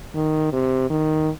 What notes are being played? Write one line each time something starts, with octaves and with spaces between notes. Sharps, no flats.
D#3
C3
D#3